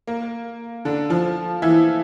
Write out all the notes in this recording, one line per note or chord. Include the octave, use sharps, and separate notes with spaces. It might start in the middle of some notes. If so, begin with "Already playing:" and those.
A#3
D3 D4
F3 F4
E3 E4